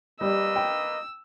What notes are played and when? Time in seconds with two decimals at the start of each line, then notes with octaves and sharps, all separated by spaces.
0.21 G3 A#3 B4 D#5 E6
0.56 G5